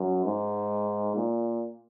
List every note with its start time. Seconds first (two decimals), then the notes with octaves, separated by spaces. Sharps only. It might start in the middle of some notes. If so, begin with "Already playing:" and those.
Already playing: F#2
0.25 G#2
1.16 A#2